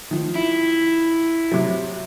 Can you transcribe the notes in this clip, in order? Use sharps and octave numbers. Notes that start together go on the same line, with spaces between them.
D#3 F3
E4
C3 F#3